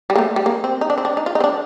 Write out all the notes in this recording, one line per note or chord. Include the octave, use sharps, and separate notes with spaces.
G3
A#3
A3
G3
A#3
C4
D#4
D4
C4
D4
D#4
F4
D#4
C4
D4